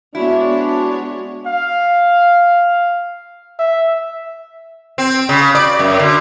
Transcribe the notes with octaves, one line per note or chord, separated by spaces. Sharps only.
G#3 B3 D4 E4 F#4 C#5
F5
E5
C4
C#3
D5
F#2
D3